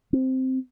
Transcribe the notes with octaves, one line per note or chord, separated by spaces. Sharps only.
C4